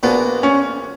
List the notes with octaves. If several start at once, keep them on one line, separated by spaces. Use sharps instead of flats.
A#1 A#2 A#3 B3 D4 F#4
C#4